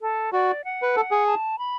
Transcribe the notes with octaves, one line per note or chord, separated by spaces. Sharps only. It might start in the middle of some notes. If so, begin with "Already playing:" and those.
A4
F#4 D5
F#5
B4
A4
G#4
A5
B5